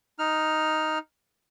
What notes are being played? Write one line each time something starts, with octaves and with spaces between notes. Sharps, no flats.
D#4 F6